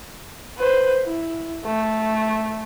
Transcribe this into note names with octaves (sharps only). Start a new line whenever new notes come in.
B4 C5
E4
A3